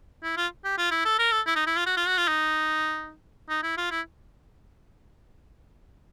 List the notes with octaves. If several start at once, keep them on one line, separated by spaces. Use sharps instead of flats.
E4
F4
G4
F4
E4
A4
A#4
A4
E4
D#4
E4
F4
F#4
F4
F#4
F4
D#4
D#4
E4
F4
E4